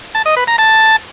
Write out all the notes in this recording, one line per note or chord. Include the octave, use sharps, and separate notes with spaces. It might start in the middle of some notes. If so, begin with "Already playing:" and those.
A5
D#5
B4
A#5
A5